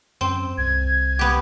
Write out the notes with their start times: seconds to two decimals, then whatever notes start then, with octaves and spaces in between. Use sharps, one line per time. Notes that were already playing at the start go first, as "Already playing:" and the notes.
0.21 F#2 C4
0.58 C2 G#6
1.19 B3 G4